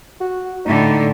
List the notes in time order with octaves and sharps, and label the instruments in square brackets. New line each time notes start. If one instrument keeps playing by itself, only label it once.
[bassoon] F#4
[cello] A2 D3 [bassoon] D#4